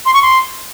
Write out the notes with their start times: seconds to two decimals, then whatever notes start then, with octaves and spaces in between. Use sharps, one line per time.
0.06 C6
0.14 C#6
0.22 C6